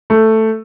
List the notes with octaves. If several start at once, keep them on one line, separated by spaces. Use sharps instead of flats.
A3